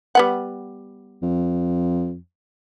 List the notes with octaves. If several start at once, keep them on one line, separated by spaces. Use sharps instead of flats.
G3 B3 F#5
F2